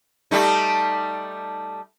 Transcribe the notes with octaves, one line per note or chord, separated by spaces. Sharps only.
G3 A3 D#4